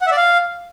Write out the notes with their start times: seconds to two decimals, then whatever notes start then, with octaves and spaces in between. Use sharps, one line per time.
0.01 F#5
0.07 E5
0.12 D5
0.17 F5